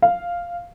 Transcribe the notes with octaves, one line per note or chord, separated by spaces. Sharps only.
F5